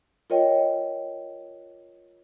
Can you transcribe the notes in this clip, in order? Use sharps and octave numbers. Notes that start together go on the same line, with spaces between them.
F4 A#4 C#5 D#5 G5